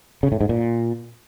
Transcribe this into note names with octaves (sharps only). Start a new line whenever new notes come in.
C#3
A2
G#2
A#2